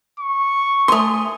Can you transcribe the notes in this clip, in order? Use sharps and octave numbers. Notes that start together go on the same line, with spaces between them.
C#6
A3 G#5 C6 D#6